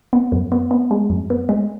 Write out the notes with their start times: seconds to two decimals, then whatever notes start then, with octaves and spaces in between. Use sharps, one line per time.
0.13 B3
0.32 F#2
0.52 B3
0.71 B3
0.91 G#3
1.10 F#2
1.30 B3
1.49 G#3